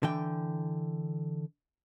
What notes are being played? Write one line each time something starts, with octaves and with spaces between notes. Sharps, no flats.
D3 E3 G5